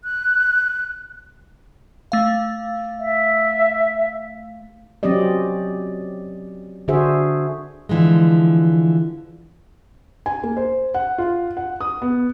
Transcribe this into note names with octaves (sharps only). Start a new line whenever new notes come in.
F#6
A3 F5
E5
F#3 C4 C#4 G4 D5 D#5
D3 D4 F#4 G#4 C5 E5
D3 E3 F3 G#3
G#5
A#3
C5
F#5
F4
F#5
D#6
B3